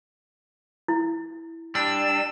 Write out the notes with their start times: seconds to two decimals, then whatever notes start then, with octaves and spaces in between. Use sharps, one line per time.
0.88 E4
1.75 G3 D4 E6